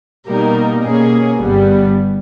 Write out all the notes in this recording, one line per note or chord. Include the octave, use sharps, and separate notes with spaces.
B2 G3 A#3 D#4 A#4
B2 A#3 C#4 G#4
G1 G2 G3 B3